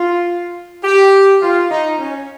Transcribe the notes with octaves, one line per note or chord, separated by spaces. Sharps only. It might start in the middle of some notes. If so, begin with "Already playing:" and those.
Already playing: F4
G4
F4
D#4
C#4